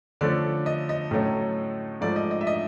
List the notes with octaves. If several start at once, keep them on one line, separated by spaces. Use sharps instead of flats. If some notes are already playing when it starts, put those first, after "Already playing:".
D3 F3 A3 C#4 D5
D#5
D#5
A2 F#3 A3 C#4
G#2 F3 A3 D5
D#5
D#5
E5
D#5